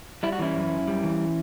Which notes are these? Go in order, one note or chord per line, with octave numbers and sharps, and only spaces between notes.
G3 E4
F#4
E3 C#4 E4
F#2
F#2
G3
E3